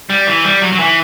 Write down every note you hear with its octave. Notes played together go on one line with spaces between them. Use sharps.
G3
E3
G3
F#3
F#3
E3